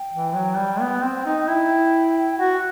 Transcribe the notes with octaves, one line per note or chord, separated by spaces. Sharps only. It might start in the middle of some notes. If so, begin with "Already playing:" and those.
Already playing: G5
E3
F#3
G3
B3
C4
D#4
E4 G5
F#4 F#5